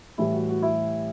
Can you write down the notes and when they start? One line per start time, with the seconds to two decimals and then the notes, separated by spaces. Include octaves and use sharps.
0.18 A2 E3 G3 E4
0.33 F#4
0.49 F#4
0.62 E4